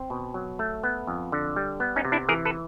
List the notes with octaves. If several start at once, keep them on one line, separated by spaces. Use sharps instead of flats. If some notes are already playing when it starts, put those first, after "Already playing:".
Already playing: C4
B2
F#3
A3
B3
F2
D3
G3
B3
C#4 D#4
C3
D4 E4
E3 G#4 A#4
A4 B4